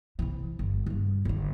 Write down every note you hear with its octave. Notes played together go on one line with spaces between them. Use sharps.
C3 E3
G1
G2 C#3
G1 D3